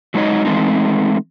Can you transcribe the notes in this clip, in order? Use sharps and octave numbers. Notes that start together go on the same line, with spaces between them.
F#3 G#3 A3 D#4 C#5 D#5
E3 G#3 A3 C4 D#4